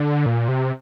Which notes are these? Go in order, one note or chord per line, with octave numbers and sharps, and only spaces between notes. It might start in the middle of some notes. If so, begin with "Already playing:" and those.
Already playing: D3
A#2
C3